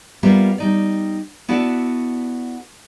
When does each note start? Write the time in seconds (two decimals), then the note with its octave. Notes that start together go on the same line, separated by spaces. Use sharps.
0.23 G3 A#3 B3 F4 E5
0.58 G3 D#4 D5
1.49 B3 E4 F#4 A4 D5